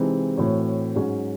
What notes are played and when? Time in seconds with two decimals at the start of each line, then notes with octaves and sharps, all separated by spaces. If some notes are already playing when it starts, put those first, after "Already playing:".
Already playing: C3 E3 G#3 C4 D#4
0.38 A2 E3 C4 F#4 C#5
0.96 G#2 F#3 C#4 F#4 C#5